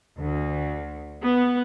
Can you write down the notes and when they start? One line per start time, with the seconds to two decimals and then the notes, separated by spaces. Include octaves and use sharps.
0.19 D2
1.22 B3